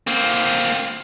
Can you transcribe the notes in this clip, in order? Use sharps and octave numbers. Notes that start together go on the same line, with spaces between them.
A#3 C4